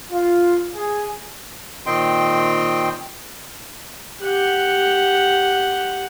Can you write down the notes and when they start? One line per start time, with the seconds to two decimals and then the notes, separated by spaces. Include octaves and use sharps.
0.11 F4
0.75 G#4
1.86 A#2 D#3 C4 D#5 G5 C6
4.22 G4 F#5